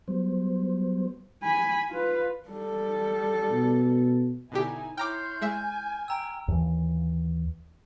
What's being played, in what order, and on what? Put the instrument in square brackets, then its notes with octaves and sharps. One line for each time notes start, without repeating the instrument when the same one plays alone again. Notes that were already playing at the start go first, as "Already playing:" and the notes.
[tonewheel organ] F#3 G3 B3 C5
[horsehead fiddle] G#5 B5
F4 B4
G3 A4
[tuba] B2
[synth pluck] B2 D3 G4 [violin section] D#4 E4 G#5
[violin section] E4 C#5 C6 [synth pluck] G5 A#5 D6 [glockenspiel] F6 [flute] G6
[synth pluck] G#3 E5 [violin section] G#5
[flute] G5 [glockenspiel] A#5 E6
[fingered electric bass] D#2 E3